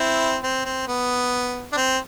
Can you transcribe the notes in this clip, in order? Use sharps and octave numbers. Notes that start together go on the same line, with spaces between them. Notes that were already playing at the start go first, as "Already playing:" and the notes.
Already playing: C4 E4
C4
C4
B3
D4
C4